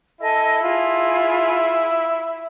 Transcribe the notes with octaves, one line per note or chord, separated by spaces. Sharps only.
E4 A4 D#5 G#5
F4 G#4